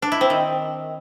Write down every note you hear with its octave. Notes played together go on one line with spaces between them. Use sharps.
D4
E4
C4
D#3